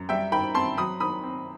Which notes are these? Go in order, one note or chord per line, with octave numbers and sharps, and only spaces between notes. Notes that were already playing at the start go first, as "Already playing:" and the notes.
Already playing: F#2
G3 E5 G5
D#3 G5 B5
C4 A5 C6
F#3 B5 D#6
D#3 B5 D#6
C4